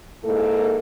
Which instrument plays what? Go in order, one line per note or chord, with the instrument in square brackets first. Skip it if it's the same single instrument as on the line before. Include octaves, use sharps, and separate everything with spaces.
[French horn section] G#2 A#3 E4 A4